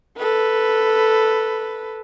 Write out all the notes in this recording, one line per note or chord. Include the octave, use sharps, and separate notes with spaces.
A4 B4